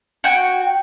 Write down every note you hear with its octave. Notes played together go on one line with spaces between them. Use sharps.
F#4 G5